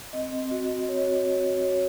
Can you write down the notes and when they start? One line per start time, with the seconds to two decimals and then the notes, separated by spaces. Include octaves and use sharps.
0.13 C4 D#5
0.33 C4
0.51 F#4
0.70 C4
0.89 F#4 C#5
1.07 F#4
1.26 F#4
1.45 F#4
1.63 F#4 C#5